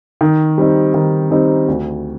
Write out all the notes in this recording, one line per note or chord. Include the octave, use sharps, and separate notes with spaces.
D#3
G3 C4 D#4
D#3
G3 C4 D#4
D2